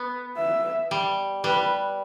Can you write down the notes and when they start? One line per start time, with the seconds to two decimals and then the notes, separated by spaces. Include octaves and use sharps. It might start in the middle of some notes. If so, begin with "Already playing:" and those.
Already playing: B3
0.37 E5
0.91 G3
1.44 G3 B4